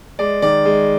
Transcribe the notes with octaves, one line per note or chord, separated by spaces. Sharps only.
G#3 D5
D#3 D5
G#3